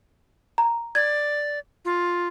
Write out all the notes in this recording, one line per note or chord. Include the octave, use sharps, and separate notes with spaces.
A#5
D5 G#6
F4